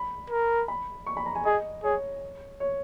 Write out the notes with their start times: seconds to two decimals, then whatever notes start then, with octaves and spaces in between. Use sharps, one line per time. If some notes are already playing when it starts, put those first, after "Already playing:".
Already playing: B5
0.30 A#4
0.68 B5
1.07 C#6
1.17 B5
1.26 A#5
1.35 G#5
1.45 G#4 D#5
1.83 G#4 C#5
2.60 C#5